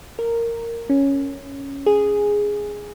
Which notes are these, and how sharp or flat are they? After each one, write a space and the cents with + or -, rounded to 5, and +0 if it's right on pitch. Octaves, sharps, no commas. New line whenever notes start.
A#4 -10
C#4 +0
G#4 -5